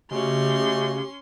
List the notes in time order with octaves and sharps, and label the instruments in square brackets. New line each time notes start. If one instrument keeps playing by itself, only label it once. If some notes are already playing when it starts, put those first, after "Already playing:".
[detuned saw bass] C#3 [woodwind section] G#3 A3 F#4 [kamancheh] C#4 C6 [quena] G4